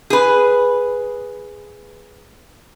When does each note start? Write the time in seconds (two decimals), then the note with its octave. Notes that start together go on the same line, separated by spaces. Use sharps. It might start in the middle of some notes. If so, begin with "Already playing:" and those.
0.10 G#4 B4